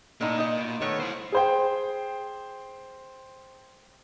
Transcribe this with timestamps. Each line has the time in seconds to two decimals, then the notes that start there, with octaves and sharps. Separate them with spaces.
0.21 A2 A#3 D#4 D5
0.38 D#4 D#5
0.58 B2
0.82 D#3 A3 B3 C#5
1.00 E4 C5
1.32 G#4 C5 G5